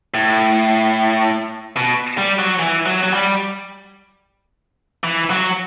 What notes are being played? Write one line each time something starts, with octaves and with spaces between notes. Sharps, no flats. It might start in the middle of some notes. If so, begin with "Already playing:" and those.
A2
B2
G3
F#3
E3
F#3
F#3
G3
E3
F#3